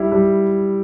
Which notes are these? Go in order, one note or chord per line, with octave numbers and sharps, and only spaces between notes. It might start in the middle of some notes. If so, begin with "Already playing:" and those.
Already playing: G3 E4
G3